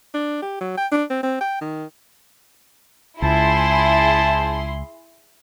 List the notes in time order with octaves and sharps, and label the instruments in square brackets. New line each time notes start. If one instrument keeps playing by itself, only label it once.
[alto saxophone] D4
G4
F#3
G5
D4
C4
C4
G5
D#3
[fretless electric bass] C#2 [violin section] E4 G#4 C6 [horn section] C5 G#5 A5